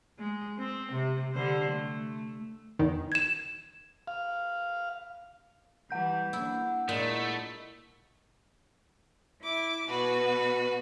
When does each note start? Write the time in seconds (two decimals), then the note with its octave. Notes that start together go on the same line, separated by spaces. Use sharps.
0.18 G#3
0.58 C4
0.92 C3
1.32 D3 G3 C5
1.71 A3
2.79 E2 D#3
3.12 G#6 E7
4.07 F5
5.90 E3 G3 F#5 G6
6.33 A#3 D4 E4
6.89 A#2 G#3 A3 E4 D#5
9.44 E4 D6
9.87 B2 F#4 B4